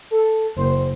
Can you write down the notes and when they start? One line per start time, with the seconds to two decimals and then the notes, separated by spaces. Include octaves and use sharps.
0.11 A4
0.57 F#1 C5